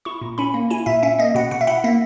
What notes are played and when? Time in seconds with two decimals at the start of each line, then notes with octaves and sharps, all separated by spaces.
0.05 E4 C#6
0.21 A#2
0.38 C#4 B5
0.54 A#3
0.70 E4 G#5
0.86 A#2 E5
1.03 C#4 E5
1.18 A#3 D#5
1.35 B2 F#5
1.51 B2 F#5
1.61 E5
1.67 E4 F#5
1.84 A#3 E5